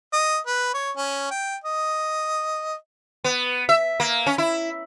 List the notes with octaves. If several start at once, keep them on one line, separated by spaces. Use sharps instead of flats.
D#5
B4
C#5
C#4
G5
D#5
B3
E5
A#3
C#4
E4